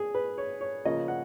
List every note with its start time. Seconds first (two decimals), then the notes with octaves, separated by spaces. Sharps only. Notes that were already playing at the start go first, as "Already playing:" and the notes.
Already playing: G#4
0.15 B4
0.38 C#5
0.61 C#5
0.85 C#3 F3 A#3 C#4 D#5
1.08 F#5